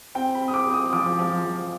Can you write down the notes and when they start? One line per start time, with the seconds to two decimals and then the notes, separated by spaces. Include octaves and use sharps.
0.15 C4 G5
0.35 B5
0.41 C4
0.48 D#6
0.54 D6
0.67 C4
0.74 D#6
0.93 F3 D6
1.19 F3
1.44 F3